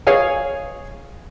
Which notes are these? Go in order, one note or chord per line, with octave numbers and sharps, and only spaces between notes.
G#4 C#5 F5 G#5